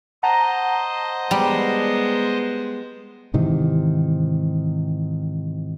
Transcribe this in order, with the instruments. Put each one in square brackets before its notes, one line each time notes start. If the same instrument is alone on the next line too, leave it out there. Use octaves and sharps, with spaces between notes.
[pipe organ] C5 D#5 [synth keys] F#5 A5 A#5
[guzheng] G3 [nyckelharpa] G#3 B3
[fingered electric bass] G#2 C3 D#3 E3